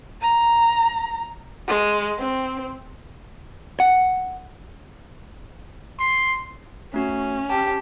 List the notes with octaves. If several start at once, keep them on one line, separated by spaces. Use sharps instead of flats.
A#5
G#3
C4
F#5
C6
A3 C#4 F#4
G4 A5